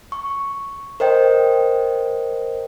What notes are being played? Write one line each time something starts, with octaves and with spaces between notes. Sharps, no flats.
C#6
A#4 C5 D#5 G5